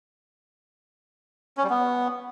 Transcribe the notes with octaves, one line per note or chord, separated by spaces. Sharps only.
C#4
G3
B3